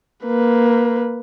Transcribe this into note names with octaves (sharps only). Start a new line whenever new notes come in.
A#3 B4